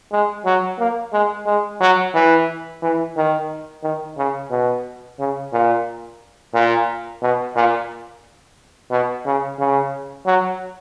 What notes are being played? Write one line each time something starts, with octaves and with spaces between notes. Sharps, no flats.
G#3
F#3
A#3
G#3
G#3
F#3
E3
E3
D#3
D#3
C#3
B2
C#3
A#2
A#2
B2
A#2
B2
C#3
C#3
F#3